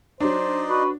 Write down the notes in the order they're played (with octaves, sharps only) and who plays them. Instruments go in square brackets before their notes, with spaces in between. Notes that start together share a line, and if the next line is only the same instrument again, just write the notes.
[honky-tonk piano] F#3 D4 [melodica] D#4 D5 D#5 [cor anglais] C5
[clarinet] F#4 [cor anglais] B4